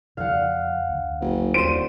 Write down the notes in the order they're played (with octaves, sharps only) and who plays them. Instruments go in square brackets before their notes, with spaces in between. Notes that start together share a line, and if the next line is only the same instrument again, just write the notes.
[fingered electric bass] F2 C#3 [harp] F5 F#5
[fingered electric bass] D2
[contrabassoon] F#1
[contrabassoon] D#1 [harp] C5 [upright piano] D7 D#7